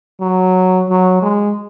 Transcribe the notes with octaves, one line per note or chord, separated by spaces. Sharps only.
F#3
F#3
G#3